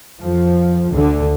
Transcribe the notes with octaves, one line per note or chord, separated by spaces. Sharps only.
F2 F3
D2 D3